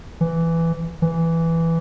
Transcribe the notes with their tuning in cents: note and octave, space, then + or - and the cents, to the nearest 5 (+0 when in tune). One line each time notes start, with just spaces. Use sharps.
E3 +10
E3 +5